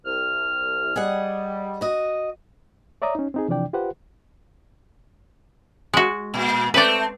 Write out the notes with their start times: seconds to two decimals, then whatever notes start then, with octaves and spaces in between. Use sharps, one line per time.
0.05 C2 F6
0.96 G3 G#4 D#5 F#5
1.81 F#4 D#5
3.02 C#5 D5 E5 A#5 D#6
3.15 C#4 D#4
3.34 C4 D#4 G#4
3.48 C3 E3 F3 D4 D5 G5
3.73 F4 G4 B4 C5 F#5
5.93 G#3 F#4
6.34 A#2
6.74 A3 C4 B4 D5